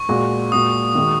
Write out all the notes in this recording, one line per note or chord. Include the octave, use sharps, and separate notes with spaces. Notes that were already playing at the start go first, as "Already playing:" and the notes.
Already playing: C#6
A#2 G#3 F#4
A#2 G#3 F#4 D#6
D#3 G#3 F#4